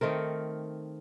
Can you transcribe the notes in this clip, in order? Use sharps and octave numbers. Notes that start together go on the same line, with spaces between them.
D#3 A3 C4 A#4